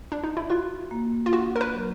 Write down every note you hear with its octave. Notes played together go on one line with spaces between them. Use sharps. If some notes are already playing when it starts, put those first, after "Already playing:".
D4
D#4
E4
F4 F#4
A#3
F4
D4 F#4
A#4
B4
F#3